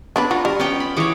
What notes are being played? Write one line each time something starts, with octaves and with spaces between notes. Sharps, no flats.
B3 C#4 D4 B4
D#4 F4 F#4
G3 A#4
B3 C#4 G4 G5
B5
E3 F#4 G#4 C#5 D6